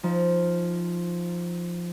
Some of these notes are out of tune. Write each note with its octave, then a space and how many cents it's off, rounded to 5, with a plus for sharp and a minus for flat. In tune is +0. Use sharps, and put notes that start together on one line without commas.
F3 +0 D#4 +15